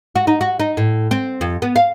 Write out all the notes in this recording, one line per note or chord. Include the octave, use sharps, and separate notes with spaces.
F#4
D#4
F#4
D#4
A2
C4
F2
B3
F5